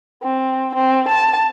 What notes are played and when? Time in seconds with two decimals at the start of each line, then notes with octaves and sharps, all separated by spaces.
0.23 C4
0.75 C4
1.08 A5